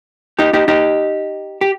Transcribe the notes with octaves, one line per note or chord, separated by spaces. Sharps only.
D#4 G4
D#4 G4
D#4 G4
G4